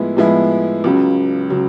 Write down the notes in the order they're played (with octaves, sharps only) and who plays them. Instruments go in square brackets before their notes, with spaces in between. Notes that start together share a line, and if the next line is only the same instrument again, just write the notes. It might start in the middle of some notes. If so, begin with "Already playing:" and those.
Already playing: [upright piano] A2 F3 G#3 B3 E4
A2 F3 G#3 B3 E4
C#2 C#3 F#3
C#3 F#3